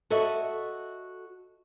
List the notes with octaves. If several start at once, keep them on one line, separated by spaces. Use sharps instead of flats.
F#4 A4 C#5 D#5 E5